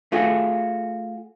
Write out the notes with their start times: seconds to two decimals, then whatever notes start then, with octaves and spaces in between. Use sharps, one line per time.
0.12 A3 F4 F#4 G#4